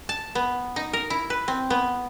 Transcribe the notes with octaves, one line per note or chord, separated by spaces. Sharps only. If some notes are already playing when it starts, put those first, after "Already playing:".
A5
B3
D#4
A#4
E4
B4
C4
B3